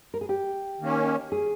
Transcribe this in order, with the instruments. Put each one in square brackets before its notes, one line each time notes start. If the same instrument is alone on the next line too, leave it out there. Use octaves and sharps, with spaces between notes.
[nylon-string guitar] A#4
G#4
G4
[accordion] D#3 A#3 C#4
[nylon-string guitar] G#4